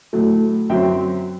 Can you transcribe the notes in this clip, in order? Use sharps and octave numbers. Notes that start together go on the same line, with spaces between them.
A2 F#3 A3
F#2 F#3 C4 E5 G5